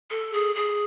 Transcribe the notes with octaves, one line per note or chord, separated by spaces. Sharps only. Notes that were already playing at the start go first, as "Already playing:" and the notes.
A4
G#4
G#4